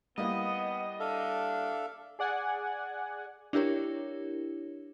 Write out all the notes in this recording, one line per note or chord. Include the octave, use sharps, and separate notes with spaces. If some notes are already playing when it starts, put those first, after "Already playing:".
G3 A#3 B3 E4 D#5
D4 A4 E5 F5
G#4 D5 F#5 G#5
D4 E4 G4 A#4 C#5